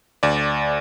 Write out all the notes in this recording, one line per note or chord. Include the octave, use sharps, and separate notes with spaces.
D2 D5